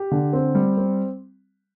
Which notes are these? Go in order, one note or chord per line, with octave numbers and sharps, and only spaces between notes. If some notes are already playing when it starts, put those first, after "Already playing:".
Already playing: G4
D3
C4
G3
C4